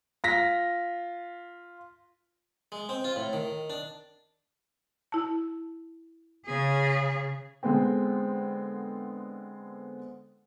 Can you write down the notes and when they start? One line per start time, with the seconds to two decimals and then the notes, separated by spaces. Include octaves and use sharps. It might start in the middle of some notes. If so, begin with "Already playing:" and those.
0.24 F4 A#6 B6
2.72 G#3
2.89 C4
3.04 F4
3.16 A2
3.33 D#3
3.70 D4
5.12 E4 A5
6.47 C#3 G#4
7.63 D3 G#3 B3 C4 G5